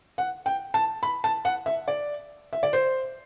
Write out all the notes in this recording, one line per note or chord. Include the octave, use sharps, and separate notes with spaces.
F#5
G5
A5
B5
A5
F#5
E5
D5
E5
D5
C5